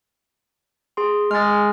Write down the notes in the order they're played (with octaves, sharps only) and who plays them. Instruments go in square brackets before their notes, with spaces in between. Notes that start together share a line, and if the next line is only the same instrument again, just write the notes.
[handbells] G#4 C6
[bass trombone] G#3 [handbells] F6 A6